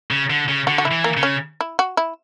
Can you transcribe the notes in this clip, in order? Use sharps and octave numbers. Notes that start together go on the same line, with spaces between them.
C#3
D3
C#3
D3 F#4
F#4
E4
E3
A#3
C#3
C#4
E4
F#4
E4